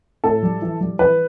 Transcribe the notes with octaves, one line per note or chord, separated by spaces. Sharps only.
A2 A4
G3
E3
G3
E3 B4